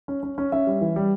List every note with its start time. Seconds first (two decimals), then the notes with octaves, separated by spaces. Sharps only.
0.08 C#4
0.23 C#4
0.38 C#4
0.52 C#4 E5
0.67 G3
0.81 E3
0.96 G3